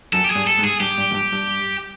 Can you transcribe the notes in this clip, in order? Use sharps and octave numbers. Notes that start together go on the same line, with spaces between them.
F#2 A4
G4
G2 G#4
A4
G#2
G#4
G2 G4
G2
F#2
G2
G2